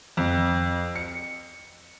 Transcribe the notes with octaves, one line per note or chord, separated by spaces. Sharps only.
F2
C#7